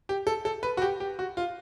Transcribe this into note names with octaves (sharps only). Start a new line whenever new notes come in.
G4
A4
A4
B4
F#4
G4
G4
F#4
F4